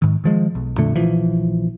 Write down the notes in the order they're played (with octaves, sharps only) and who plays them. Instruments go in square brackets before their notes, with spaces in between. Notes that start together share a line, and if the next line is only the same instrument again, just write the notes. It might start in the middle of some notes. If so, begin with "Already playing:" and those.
[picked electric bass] G#2 D#3
D#3 F3 G#3
B1
F2 A#2 D3 A3
A#1 E3 F3